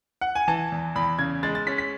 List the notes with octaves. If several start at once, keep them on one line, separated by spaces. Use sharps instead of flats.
F#5
G#5
E3 A5
E2
E2 B5
C#3 G#6
G#3 A6
A6
C#4 B6
B6